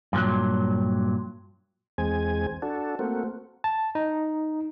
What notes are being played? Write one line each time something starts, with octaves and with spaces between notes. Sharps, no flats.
G2 A#2 F3 F#3
E2 G#3 C4 G#5
D4 F#4 A4
A3 A#3 C4 F#4
A5
D#4